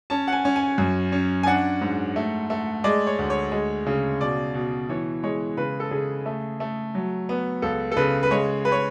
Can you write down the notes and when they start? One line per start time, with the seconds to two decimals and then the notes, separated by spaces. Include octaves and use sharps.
0.10 C#4 A5
0.28 F#5
0.32 G#5
0.45 C#4
0.56 G#5
0.78 F#2
1.12 C#4
1.43 G#5
1.46 D4 F#5
1.81 G#2
2.16 A3
2.50 A3
2.84 G#3 D5
3.07 C#5
3.19 D2
3.30 C#5
3.52 G#3
3.86 C#3
4.20 B2 D5
4.54 B2
4.89 E3 C#5
5.23 G#3 C#5
5.57 C#3 B4
5.80 A4
5.91 C#3 G#4
6.26 A3
6.60 A3
6.95 F#3
7.29 B3
7.62 C#2 A4
7.92 A4
7.96 C#3 B4
8.23 B4
8.31 G#3 C#5
8.65 B4
8.72 C#5